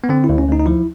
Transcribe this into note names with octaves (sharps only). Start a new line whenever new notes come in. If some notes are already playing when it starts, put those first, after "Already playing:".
B3
D3 C4
E4
D2
C#4
D2 D#4
D#4
F3 E4